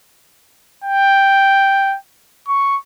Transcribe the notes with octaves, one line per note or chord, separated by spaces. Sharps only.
G5
C#6